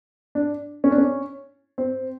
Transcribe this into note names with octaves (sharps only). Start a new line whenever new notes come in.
D4
C#4
D4
C#4
C4